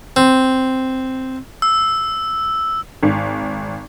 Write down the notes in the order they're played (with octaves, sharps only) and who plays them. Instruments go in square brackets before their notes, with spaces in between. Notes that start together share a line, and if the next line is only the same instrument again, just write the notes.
[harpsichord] C4
[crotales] E6
[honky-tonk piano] G#1